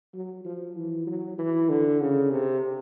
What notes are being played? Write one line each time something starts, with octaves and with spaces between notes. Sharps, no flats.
F#3
F3
E3
F#3
E3
D3
C#3
C3